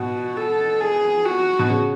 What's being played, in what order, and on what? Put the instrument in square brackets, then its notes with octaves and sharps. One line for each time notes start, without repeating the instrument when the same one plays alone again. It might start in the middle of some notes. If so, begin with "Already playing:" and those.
Already playing: [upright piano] B2 [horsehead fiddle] F#4
[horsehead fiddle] A4
G#4
F#4
[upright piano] B2
C#3